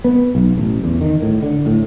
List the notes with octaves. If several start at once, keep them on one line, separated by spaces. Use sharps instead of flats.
B3
B1
A1
E2
D#3
A2
D3
A2